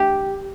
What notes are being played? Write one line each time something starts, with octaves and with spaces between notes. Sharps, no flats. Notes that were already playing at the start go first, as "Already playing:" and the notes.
Already playing: G4